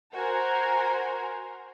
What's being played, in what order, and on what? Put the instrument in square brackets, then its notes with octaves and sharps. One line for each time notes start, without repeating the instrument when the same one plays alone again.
[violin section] F#4 A#4 C5 G#5 A#5